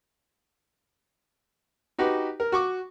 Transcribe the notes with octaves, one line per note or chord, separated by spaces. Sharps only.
D#4 F#4 G4 B4
A#4
F#4 C#6 D6